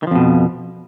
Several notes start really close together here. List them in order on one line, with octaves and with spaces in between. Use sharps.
D#3 F3 F2 B2